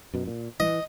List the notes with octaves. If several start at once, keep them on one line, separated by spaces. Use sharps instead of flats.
F#2 B2
A#2
E3 D#5